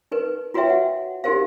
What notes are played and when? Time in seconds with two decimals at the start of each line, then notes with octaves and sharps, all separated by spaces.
0.12 D#4 A#4 B4
0.54 F4 F#4 B4 C#5 E5 G5
0.70 F#5
1.24 D#4 F#4 G4 A#4 C5 F5